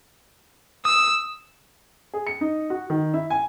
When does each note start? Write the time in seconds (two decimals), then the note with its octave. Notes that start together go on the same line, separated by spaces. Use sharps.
0.85 D#6 E6
2.14 G#4
2.27 C#7
2.41 D#4
2.70 F#4
2.90 D#3
3.14 E4
3.30 G#5